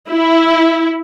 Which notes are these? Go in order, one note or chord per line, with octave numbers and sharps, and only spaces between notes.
E4